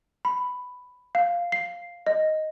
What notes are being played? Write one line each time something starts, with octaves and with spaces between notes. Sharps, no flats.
B5
F5
C7
D#5